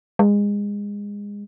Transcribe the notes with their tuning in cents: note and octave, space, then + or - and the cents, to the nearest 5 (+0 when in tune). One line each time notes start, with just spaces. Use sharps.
G#3 -25